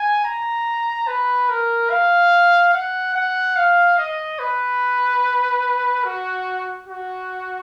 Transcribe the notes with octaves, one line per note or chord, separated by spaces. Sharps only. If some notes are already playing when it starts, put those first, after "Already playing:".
Already playing: G#5
A#5
B4
A#4
F5
F#5
F#5
F5
D#5
B4
F#4
F#4